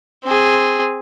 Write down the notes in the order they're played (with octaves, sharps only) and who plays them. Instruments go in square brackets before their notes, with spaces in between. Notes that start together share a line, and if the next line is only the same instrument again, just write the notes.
[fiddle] C4 G#4